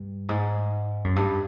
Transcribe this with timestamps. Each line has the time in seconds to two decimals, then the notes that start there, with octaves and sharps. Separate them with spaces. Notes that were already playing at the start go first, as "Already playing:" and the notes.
Already playing: G2
0.29 G#2
1.04 F#2
1.16 G2